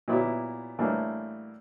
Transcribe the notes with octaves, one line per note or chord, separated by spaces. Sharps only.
A#2 F#3 B3 E4 G4
A2 E3 G3 A#3 D4